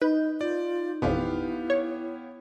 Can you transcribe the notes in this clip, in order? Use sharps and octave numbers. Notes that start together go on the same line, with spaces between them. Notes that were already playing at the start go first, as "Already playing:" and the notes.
D#4 B4 D#5 G6
F4 D5
A1 F2 B2 B3 E4 G4 F5
C#5